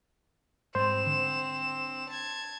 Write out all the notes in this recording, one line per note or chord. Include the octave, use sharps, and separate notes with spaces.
G#2 G3 C4 C5 E7
D3
A5 G#6